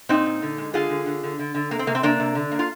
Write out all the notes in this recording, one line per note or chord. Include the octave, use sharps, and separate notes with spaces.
A#2 C4 D#4
A#2
D3
G#3
D3 F4 G#4
D3
D3
D3
D3
D3
C3 A#3
C4
C3 A#3
C4
C3 A#3 D4
C3
D3
A#3
F4